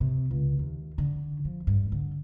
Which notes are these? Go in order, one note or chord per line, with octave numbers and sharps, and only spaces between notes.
C3
C#2
D#2
D3
F3
G2
D3